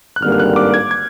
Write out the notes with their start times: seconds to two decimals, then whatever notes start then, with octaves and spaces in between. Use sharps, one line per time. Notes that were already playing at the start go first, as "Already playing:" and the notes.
0.16 F#6
0.22 G#1 G2 D3 G3 A#3 F6
0.32 F6
0.40 F#6
0.56 D6
0.74 G#6
0.91 G#6